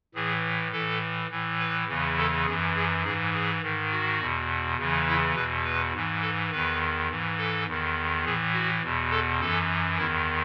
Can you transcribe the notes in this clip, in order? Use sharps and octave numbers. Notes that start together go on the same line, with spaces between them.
A2 E3 G#4
A2 E3 A4
A2 E3
B4
E2 C#3 E3
A4
F#2 E3 G#4
G#4
G#2 E3 G#4
G#4
G#2 D#3
F#4
E2 B2
E2 C#3 E3
E4
E2 B2 B4
B4
G#2 E3
A4
E2 D#3 B4
G#2 E3
A4
E2 D#3
A2 E3 G#4
F#4
E2 B2
A4
F#2 E3 A4
E2 D#3 E4